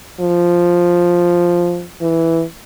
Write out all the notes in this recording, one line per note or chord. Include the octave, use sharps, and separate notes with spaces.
F3
E3